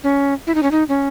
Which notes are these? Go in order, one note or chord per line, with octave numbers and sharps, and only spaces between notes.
C#4
E4
D#4
C#4
D#4
C#4